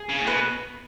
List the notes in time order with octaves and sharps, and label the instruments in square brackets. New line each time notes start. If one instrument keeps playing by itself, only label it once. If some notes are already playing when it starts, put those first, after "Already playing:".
Already playing: [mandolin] G#4
[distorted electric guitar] C#3
A2
[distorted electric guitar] B2 [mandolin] B4